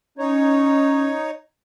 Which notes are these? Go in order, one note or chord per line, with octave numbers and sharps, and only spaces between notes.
C#4 D#4 C#5